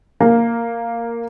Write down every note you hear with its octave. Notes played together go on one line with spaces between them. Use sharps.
A#3